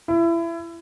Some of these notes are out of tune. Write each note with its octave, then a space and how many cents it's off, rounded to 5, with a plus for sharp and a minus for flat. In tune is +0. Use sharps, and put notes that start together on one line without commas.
E4 +25